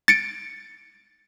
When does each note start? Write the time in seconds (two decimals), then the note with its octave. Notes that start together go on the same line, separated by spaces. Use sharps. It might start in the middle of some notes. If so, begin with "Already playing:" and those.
0.08 A6 C#7 D7